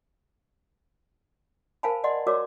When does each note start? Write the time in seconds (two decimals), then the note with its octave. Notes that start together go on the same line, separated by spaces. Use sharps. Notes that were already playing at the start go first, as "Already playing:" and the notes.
1.83 A#4 C5 F5 G#5 A5 B5
2.04 D5 D#5 F#5 C6
2.27 F#4 A#4 C#5 D5 D6 E6